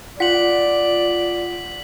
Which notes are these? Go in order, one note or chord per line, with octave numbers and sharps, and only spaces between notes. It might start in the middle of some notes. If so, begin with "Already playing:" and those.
F4 D5 F#5 B6 F#7